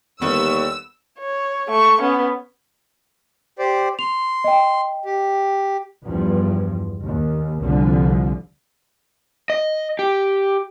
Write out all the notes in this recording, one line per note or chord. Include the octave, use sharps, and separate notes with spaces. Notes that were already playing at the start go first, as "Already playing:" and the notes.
D#2 D3 G3 B3 C#6 E6
C#5
A3 C#6
B3 C#4
G4 C5 D5
C6 F7
D#5 G5
G4
E2 G2 F3
D#2
C2 D3 F3
D#5
G4